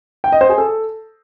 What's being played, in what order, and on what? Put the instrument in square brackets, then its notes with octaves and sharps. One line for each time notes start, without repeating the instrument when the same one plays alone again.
[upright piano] G5
D#5
C5
G#4
A4